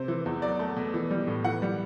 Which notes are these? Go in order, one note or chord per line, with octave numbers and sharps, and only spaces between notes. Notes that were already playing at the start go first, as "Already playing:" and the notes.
Already playing: C3 C5
E3
E2
F#3 D5
A3
B2
E3
G3
A2
E3 F#5
G3